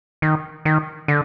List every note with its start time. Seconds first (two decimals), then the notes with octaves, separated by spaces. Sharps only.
0.22 D#3
0.65 D#3
1.08 D3